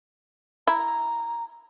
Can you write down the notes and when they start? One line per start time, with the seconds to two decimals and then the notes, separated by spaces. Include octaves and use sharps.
0.67 E4 A#5